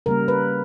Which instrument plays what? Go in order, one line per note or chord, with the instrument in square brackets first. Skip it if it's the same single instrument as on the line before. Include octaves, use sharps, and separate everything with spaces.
[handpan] C#3 G3 A#3 A#4
B4